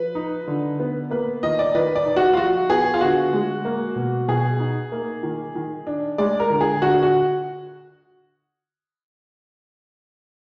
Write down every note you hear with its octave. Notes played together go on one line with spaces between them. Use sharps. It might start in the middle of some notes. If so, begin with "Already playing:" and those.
Already playing: F3 B4
D#4
D3
B3
A#3 B4
D#3 D#5
D5
D#3 B4
D5
D#4
F#4
F4
F3 F#4
B3 G#4
F4
D3 F#4
G#3
A#3
B2
B2 G#4
D#4
A#3
D#3
D#3
D4
G#3 D5
A#4
D3
G#4
D3 F#4
F#4